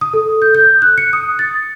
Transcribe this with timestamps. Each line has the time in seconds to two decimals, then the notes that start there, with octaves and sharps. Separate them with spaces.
0.01 D#6
0.14 A4
0.42 G6
0.55 G6
0.82 F#6
0.98 C#7
1.13 D#6
1.39 A6